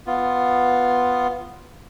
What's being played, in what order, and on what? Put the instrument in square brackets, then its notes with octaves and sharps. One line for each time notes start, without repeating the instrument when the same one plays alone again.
[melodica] B3 F4